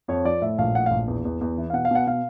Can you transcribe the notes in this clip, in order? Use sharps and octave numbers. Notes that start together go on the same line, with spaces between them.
F2 C#5
F3 D5
A2 E5
A#1 F5
A2 F#5
A#1 F5
E2
E2
E2
E3
F5
B2 F#5
F5
B2 F#5
B2 F5